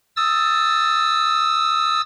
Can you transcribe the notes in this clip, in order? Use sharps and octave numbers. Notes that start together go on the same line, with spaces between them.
D#6 E6 A6